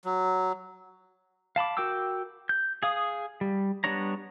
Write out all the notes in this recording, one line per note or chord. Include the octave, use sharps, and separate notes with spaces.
F#3
F5 A5 B5 D6
F#4 A#4 G5 D6 E6
G6
G#4 F5 D#6
G3
G3 B3 D4 C#5 A#5